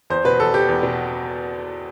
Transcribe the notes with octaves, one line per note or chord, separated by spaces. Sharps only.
E2 C5
B2 B4
E2 A4
B2 G4
E2
B2